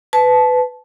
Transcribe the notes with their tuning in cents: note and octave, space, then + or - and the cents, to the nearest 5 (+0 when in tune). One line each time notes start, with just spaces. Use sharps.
B4 +20 A5 -20